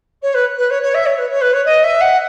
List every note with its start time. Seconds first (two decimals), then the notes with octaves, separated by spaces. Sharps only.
0.22 C#5
0.34 B4
0.58 B4
0.70 C#5
0.82 C#5
0.94 E5
1.06 C#5
1.17 B4
1.29 C#5
1.41 B4
1.53 C#5
1.65 D#5
1.83 E5
2.00 F#5